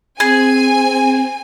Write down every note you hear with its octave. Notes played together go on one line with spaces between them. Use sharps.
C4 G#4 G#5